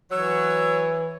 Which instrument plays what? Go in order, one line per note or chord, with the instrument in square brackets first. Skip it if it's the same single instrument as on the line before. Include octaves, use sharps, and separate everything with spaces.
[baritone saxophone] E3 [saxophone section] F#3 [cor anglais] C#5 [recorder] E6